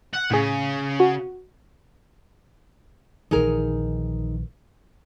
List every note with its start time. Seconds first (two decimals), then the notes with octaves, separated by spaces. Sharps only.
0.14 F#5
0.31 A2 C#3 G#4
1.00 F#4
3.31 A#1 D#3 E3 D#4 G#4 A#4